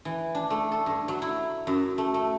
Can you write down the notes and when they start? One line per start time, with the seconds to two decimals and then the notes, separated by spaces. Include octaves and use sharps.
0.05 E3
0.35 D4
0.50 A3
0.72 A4
0.86 G2
1.08 F#3
1.22 E4
1.67 F#2
1.98 A3
2.14 A3